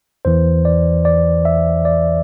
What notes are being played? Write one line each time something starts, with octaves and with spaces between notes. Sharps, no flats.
E2 E3 C5
D5
D5
E5
D5